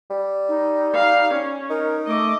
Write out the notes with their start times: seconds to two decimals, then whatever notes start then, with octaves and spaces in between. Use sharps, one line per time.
0.10 G3
0.49 D#4
0.94 F5
1.34 C#4
1.70 D#4 A#4
2.07 A3 D#5 D6